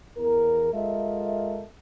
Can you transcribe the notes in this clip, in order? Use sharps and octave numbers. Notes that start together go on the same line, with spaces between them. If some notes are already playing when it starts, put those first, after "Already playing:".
E2 A#4
G#3 F4 A4 A#4 D#5 E5